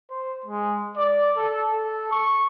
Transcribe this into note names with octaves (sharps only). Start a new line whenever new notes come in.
C5
G#3
D5
A4
A4
C#6